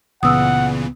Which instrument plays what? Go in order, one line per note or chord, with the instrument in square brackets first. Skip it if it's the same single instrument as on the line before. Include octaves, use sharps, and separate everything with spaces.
[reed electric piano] C#2 B3 [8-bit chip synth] A#2 C#3 E3 [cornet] F#5 [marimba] D#6 E6